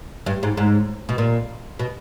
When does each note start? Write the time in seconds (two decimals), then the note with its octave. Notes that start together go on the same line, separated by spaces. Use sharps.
0.26 G2
0.43 G#2
0.57 G#2
1.09 B2
1.18 A#2
1.79 B2